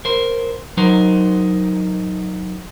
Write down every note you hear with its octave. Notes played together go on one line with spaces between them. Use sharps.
A#4 C5
F#3 D#4 A#4 C5